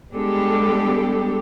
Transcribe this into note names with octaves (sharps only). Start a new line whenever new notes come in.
G3 G#3 B3 D4 G4 A4